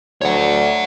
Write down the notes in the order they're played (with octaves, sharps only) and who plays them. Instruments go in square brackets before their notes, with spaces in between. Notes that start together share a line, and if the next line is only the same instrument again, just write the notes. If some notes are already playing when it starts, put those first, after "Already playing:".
[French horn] D2 [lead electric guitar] C#5 F#5